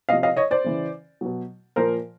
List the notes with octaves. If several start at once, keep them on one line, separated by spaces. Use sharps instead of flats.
C3 F3 D#5 F5
D#5 F5
C#5 D#5
C5 D5
C#3 E3
B2 F#3
A#2 F3 A#4 C5